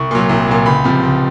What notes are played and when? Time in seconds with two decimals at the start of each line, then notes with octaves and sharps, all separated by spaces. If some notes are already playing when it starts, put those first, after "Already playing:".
Already playing: C2 C#6
0.11 A#2 F#3
0.29 C2
0.48 A#2 F#3
0.66 C#2 B5
0.84 C3 F3
1.03 C#2